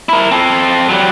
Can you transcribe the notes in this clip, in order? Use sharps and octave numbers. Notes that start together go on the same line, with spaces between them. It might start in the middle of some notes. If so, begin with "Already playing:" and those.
E4 A#4
C4 A4
F#3 G3